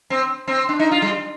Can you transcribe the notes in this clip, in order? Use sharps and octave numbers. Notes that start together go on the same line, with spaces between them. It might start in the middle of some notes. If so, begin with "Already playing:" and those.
C4
C4
D4
D#4
F4
G3